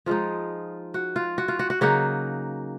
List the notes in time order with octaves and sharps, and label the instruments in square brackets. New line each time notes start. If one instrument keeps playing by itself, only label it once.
[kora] F3 G#3 D#4 F4
F#4
F4
F#4
F4
F#4
F#4
C#3 F#3 A#3 D#4 F#4